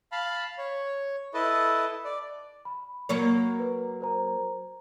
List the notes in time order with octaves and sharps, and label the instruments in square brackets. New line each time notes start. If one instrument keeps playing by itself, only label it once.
[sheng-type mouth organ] F5 A5 B5
C#5
E4 A4 B4 D#5 A5
D5
[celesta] B5
[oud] F#3 A#3 C#5
[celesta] B4
A#4 C5 A#5